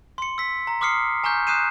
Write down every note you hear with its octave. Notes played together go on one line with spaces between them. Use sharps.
C6 C#7
E6 B6
A#5
C6 D6 D#6 F6 C7 C#7
G#5 A#5 C#6 F6 G6
D#6 F#6 G6 C7 D#7 E7